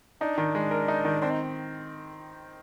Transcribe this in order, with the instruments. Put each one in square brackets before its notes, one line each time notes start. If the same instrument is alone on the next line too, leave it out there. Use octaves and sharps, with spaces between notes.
[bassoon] D4 [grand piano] D#4
[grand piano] D#3
G#3
A#4
D#4
D#3
[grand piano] C4 [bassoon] D4
[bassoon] D#4